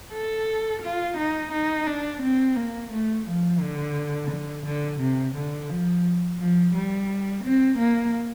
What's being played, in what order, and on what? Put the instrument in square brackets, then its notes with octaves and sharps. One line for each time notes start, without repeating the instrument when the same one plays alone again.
[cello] A4
F4
D#4
D#4
D4
C4
A#3
A3
F3
D3
D3
D3
C3
D3
F3
F3
G3
C4
A#3